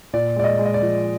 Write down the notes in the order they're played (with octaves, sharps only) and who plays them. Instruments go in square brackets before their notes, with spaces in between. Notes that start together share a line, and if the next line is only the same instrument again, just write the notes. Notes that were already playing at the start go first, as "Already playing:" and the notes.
[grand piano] A#2 D5
G#3 D5
D#5
G#3
D#5
D5
F3